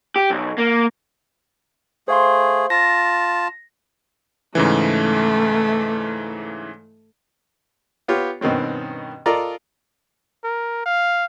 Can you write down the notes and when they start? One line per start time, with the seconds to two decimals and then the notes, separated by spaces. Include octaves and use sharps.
0.16 G4
0.30 B1
0.58 A#3
2.08 A3 G#4 C5 F5 C6
2.70 F4 A5 A#6
4.55 G#2 C#3 E3 A3
8.08 B3 F4 G4 C#5
8.41 G2 B2 D#3 C4 C#4
9.26 F4 A4 A#4 D5 D#5 A#5
10.44 A#4
10.86 F5